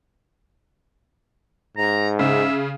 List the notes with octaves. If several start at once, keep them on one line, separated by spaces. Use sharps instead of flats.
G#2 A#5
C#3 E5